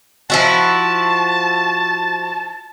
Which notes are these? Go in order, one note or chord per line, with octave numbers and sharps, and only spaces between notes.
F3 E4 F#4 A5